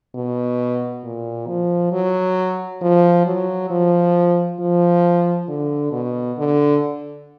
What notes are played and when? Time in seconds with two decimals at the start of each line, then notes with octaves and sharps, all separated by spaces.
0.15 B2
1.04 A#2
1.48 F3
1.92 F#3
2.82 F3
3.26 F#3
3.70 F3
4.60 F3
5.48 D3
5.92 B2
6.38 D3